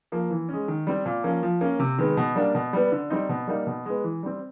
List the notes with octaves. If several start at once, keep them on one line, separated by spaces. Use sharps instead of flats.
F3 A#3
E3
G#3 C#4
D#3
G3 C4
A#2
F3 A#3 C#4
F3
A#3 C#4
C3
D#3 G#3 B3
B2
G3 A#3 D4
B2
G3 B3
D3
G3 C4 D#4
B2
G3 A#3 D#4
B2
G#3 B3
E3
G3 C4